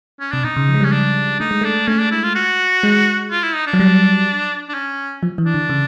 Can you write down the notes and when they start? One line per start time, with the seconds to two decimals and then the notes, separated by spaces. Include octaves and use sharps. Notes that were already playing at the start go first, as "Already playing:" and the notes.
0.20 C#4
0.32 C3 D4
0.44 B2 D#4
0.57 C#3
0.69 F3
0.74 G#3
0.80 G3 C#4
0.92 D4
1.40 A3 D#4
1.51 G#3
1.61 A3
1.65 D4
1.88 A3 C#4
1.99 D4
2.11 E4
2.24 F4
2.35 F#4
2.83 G#3
3.31 F4
3.43 E4
3.55 D#4
3.67 D4
3.73 F#3
3.79 G3
4.69 D4
4.74 C#4
5.23 F3
5.38 E3
5.45 D4
5.54 D3
5.70 C#3